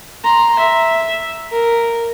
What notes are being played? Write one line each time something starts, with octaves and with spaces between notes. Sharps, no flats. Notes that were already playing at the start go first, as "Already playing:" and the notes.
A#5 C6
E5
A#4